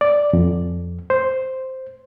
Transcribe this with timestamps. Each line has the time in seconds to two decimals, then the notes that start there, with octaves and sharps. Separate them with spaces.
0.01 D5
0.33 F2
1.10 C5